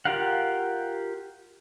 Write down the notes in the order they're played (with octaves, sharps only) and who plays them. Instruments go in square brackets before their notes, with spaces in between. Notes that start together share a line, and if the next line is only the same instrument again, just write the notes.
[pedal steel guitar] F4 G4 A#4 F5 F#5